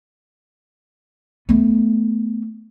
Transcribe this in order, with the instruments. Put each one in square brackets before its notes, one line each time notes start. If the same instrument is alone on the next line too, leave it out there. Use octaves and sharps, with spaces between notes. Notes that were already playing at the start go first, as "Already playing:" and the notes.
[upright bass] A3 B3